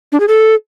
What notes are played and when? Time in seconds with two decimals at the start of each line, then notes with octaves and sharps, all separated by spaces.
0.12 D4
0.20 G#4
0.28 A4